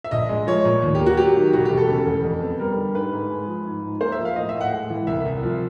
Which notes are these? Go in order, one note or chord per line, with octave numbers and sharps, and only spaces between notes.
E5
A#1 D#5
G#3
F3 C#5
A#2
D#2
G4
A#3
F#4
F#3 G4
D#3
E1 F#4
G4
E1
A4
C#3
E2
F2
B3
G3 A#4
D3
G#2 B4
G#2
G#3
F3
G#2
D#4
A#3 C5
E5
F3
F5
A2 D#5
E5
A2
F#5
G#3
E3
C2 E5
C2
F3